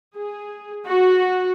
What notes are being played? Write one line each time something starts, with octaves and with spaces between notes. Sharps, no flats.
G#4
F#4